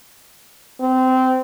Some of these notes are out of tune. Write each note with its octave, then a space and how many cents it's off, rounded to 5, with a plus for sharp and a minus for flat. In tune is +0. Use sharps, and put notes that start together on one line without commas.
C4 -20